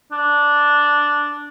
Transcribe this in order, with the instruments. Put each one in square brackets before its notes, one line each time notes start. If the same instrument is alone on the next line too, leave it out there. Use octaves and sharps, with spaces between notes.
[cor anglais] D4